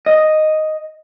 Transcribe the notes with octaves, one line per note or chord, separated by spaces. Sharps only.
D#5